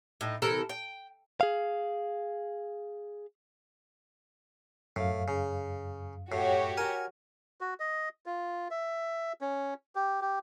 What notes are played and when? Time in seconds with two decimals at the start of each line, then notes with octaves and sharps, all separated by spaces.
0.21 A2 D#4
0.42 C3 E3 A4 A#4
0.69 G5
1.41 G#4 F5
4.96 F#2 A2 F5
5.28 C#3
6.32 A2 F#4 G4 C#5
6.77 A#4 G#5
7.61 F#4
7.80 D#5
8.26 F4
8.71 E5
9.41 C#4
9.95 G4
10.22 G4